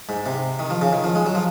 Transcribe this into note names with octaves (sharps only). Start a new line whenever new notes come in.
G#2
C3
D#3
F3
C#3
D#3
F3
G#3
F#3
F3